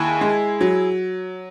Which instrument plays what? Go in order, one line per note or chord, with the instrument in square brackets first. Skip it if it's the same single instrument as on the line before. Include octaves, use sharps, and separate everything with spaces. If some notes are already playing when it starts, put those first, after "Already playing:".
Already playing: [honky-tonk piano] D#2 E4 G#4
G#3
F#3